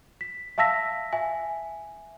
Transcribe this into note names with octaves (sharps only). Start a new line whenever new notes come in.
B6
E5 F5 A5 E6 A#6 B6
E5 G#5